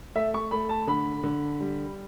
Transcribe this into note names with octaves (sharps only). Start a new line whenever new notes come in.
A3 E5
C#6
A3 B5
A5
D3 B5
D3
G3